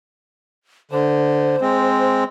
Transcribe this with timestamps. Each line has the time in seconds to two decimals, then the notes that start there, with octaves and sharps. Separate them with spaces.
0.91 D3 C5
1.61 G#3 C4